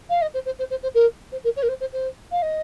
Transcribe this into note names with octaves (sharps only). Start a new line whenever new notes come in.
F5
D#5
C5
C5
C5
C5
C5
A#4
C5
A#4
C#5
A#4
C5
C5
C5
F5
D#5